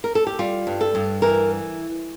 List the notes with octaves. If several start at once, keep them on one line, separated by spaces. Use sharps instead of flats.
A#4
A4
G4
G3 F4
G2
A4
G2
E3 A#4